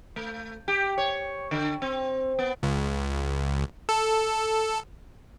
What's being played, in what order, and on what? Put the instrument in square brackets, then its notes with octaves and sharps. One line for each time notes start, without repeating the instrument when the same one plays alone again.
[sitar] A3
G4
C#5
D3
C4
B3
[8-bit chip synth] C#2
A4